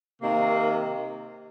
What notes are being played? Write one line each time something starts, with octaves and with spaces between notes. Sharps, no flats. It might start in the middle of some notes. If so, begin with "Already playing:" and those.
C3 D#3 A#3